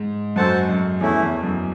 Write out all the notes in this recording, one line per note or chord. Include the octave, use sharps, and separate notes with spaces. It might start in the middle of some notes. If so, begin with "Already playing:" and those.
Already playing: G#2
F#2 F#4 A4 C5 F#5 A5
F#2
E2 A3 C#4 E4
E2
F#2